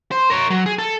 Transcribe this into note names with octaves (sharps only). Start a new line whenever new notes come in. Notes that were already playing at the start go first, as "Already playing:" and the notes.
C5
A#4 C#5
F#3
G#4
A4